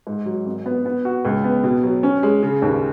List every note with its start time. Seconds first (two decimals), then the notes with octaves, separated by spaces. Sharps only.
0.07 G#2
0.26 F#3
0.46 G#1
0.66 B3
0.85 B3
1.05 F#4
1.25 C#2
1.44 B3
1.64 B2
1.83 F#3
2.03 C#4
2.23 G#3
2.43 C#3
2.62 D#2